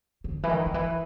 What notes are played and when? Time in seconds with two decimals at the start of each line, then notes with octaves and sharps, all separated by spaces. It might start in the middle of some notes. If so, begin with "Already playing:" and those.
0.24 D3
0.43 E3
0.49 D#3
0.66 D#3
0.74 E3